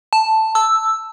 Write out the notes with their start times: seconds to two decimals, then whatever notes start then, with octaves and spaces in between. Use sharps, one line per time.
0.13 A5
0.55 E6